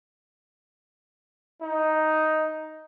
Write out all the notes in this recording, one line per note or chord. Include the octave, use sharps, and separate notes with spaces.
D#4